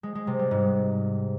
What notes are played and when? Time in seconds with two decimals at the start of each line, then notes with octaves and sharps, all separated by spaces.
0.03 G#3
0.15 G#3
0.27 C3
0.39 G3
0.51 G#2